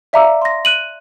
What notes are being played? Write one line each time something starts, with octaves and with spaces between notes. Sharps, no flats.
D5 E5 F5 A#5 D6 E6
C6 A#6
F#6 D#7 F#7